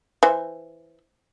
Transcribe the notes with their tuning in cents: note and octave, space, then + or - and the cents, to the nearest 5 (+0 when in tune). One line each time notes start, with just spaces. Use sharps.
E3 +0 C5 +0